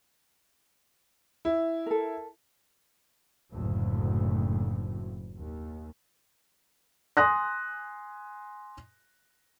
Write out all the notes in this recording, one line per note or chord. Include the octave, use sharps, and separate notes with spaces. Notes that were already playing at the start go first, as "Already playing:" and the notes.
E4
A4 A#4
F#1 D2 A2
D#2
G#5 C6 D#6 F#6 A#6